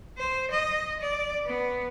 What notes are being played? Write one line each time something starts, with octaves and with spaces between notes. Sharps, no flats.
C5
D#5
D5
B3